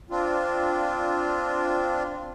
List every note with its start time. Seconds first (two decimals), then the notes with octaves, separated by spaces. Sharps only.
0.10 C4 D4 F4